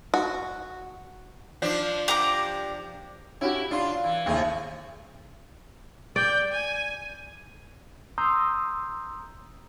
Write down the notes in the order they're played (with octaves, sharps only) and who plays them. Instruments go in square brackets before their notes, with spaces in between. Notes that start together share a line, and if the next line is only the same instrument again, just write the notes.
[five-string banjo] F#4
[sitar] F3 D4
[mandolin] G4 A#5 D6
[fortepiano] C#4 F#4 G4 [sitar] E4
[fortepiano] D4 C6 [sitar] F4
[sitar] E3
[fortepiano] D#2 [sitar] A2 C3 G#4
[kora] D5 [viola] G5
[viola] G#5
[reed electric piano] A#5 C6 D#6 E6 G6